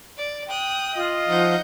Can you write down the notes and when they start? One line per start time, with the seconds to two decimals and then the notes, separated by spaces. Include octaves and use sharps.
0.18 D5
0.49 G5 D#6 F#6
0.95 F4 D#5
1.28 F3 D#4 F#5 G6